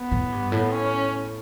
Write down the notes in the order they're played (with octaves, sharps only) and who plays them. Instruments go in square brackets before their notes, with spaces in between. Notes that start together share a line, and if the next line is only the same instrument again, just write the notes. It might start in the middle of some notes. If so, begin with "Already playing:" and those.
Already playing: [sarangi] B3
[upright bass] A2
G2
A2
[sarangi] C#4